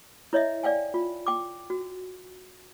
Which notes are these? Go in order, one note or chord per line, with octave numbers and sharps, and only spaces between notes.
E4 C#5 D#5 E5
D5 F5 G5 G#5
F4
G5 D6
F#4